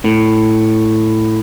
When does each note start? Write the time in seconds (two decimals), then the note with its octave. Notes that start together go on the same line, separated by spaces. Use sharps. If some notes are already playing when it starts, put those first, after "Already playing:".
0.05 A2